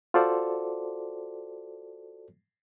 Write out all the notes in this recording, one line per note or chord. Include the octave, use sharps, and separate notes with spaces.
F4 F#4 A4 C5 D5